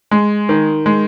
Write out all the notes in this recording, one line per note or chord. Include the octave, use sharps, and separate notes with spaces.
G#3
D#3
G#3